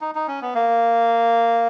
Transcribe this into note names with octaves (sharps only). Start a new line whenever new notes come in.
D#4
D#4
C#4
B3
A#3